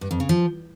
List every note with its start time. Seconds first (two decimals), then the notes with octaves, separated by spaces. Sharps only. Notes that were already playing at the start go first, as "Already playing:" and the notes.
0.01 G2
0.11 F2
0.20 C#3
0.29 F3